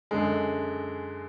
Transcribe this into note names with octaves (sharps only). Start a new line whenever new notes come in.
F#2 D3 G#3